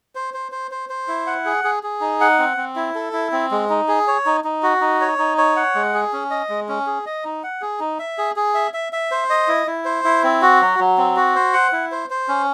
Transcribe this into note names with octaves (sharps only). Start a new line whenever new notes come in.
C5
C5
C5
C5
C5
E4
F#5
G#4
G#4
G#4
D#4
F#5
C4
C4
E4
A4
E4
C4
G#3
D#4
G#4
C#5
D#4
D#4
F#4
D#4
C#5
D#4
C#5
F#5
G#3
G#4
C#4
D#5
G#3
C#4
G#4
D#5
D#4
F#5
G#4
D#4
E5
G#4
G#4
E5
E5
E5
C5
D#5
E4
E4
C5
E4
C4
F#4
F#3
F#3
C4
F#4
C5
F#5
E4
C5
C5
C#4